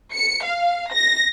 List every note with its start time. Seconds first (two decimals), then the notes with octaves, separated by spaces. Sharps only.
0.14 C#7
0.45 F5
0.92 A#6